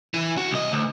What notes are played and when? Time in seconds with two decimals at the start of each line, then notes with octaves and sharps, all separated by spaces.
0.14 E3
0.37 F#4
0.51 C2 D#5
0.72 D2